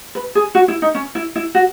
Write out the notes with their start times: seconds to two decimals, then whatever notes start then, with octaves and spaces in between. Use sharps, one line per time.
0.15 B4
0.35 G#4
0.55 F#4
0.68 E4
0.82 D#4
0.95 C#4
1.15 E4
1.36 E4
1.55 F#4